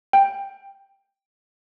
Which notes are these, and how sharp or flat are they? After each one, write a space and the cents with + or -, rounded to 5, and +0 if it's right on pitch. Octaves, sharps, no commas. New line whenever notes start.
G5 +5